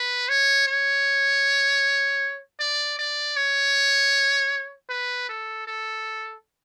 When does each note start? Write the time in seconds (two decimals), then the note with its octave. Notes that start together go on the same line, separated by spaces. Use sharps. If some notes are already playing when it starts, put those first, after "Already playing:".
Already playing: B4
0.29 C#5
0.67 C#5
2.60 D5
2.99 D5
3.36 C#5
4.90 B4
5.29 A4
5.67 A4